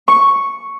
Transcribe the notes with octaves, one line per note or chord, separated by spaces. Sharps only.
C#6